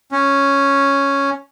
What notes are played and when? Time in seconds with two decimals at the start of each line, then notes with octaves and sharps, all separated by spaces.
0.12 C#4